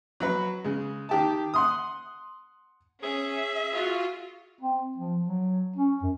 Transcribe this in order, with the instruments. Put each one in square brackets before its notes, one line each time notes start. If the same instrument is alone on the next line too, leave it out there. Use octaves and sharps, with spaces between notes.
[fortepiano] F#3 F#4 B4
C#3 G#3
D#3 G4 A5
F#5 C6 D#6
[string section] C#4 [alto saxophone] G#4 [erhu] E5
[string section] F4 [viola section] F#4
[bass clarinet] C4
F3
F#3
C#4
F#2